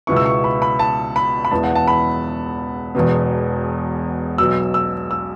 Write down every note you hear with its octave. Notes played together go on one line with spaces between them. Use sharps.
C#2 B2 B3 E4 C#6
E6
C#6
B5
B5
A5
B5
B5
E1 E2 E3 B3 E4 A5
F#5
A5
B5
E1 E2 B2 B3
B1 B2 F#3 E6
E6
E6